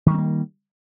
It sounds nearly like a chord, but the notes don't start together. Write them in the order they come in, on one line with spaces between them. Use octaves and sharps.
D#3 G3 C4 A#3